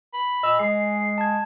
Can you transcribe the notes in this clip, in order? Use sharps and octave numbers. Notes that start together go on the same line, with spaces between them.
B5
A#2 D#5 E6
G#3 G#4 C7
A5 G#6